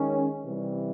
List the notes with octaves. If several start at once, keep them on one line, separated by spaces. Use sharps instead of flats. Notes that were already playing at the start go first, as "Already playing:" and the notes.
Already playing: D#3 G#3 C#4
C3 E3 G3